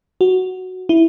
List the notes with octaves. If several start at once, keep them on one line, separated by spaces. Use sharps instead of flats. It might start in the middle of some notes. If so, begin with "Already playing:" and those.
F#4
E4